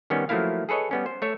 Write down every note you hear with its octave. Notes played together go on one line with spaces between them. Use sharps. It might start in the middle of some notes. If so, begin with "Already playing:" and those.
D#3 G3 B3 C#4
F3 F#3 A3 A#3 E4 F5
G#4 A4 B4 C#5 D#5
G3 B3 C#4
C5
A3 C#5 E5